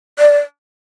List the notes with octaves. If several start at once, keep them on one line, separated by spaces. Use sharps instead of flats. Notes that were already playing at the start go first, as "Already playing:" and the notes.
D5